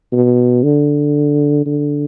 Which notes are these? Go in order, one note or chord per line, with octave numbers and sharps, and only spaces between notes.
B2
D3
D3